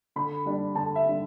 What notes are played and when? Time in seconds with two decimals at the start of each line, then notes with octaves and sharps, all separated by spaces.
0.16 D3 B5
0.46 G3 D4
0.75 D3 A5
0.96 E5
1.05 G3 D4